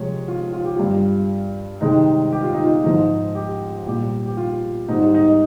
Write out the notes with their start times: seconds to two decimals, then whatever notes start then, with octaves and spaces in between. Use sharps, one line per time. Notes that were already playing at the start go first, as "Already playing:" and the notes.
Already playing: C3 F3 G#3 C#5
0.28 F4
0.53 F4
0.65 G4
0.76 G2 G3 F4
1.81 C3 D#3 G#3 D#4
2.32 G4
2.43 F4
2.54 D#4
2.65 F4
2.84 G#2 F3 G#3 D#4
3.35 G4
3.86 A#2 G3 G4
4.26 G4
4.37 F4
4.88 G#2 G3 D#4
5.14 D#4